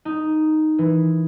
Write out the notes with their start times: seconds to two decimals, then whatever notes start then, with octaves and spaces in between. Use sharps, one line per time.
0.05 D#4
0.78 E3